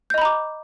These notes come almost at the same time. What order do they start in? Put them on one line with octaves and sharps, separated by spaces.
G6 D#5 B5 A#5 D6